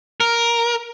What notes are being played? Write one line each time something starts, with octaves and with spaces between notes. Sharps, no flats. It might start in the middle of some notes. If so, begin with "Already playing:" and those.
A#4